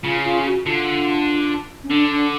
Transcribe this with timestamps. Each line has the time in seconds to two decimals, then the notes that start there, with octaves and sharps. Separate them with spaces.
0.04 C#3 F4
0.24 F4
0.46 F#4
0.65 D3 F4
1.84 C#4
1.89 D3 D4
2.11 D4